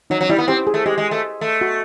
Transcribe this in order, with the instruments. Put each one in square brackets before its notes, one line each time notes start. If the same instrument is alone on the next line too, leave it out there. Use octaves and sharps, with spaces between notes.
[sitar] F#3 [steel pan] D#4
[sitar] F#3
[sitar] G3 [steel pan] E4
[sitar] B3
[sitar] C4 [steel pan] G4
[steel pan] G#4
[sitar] A3
[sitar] G#3 [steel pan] G4
[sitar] G#3
A3
A3
[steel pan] F#4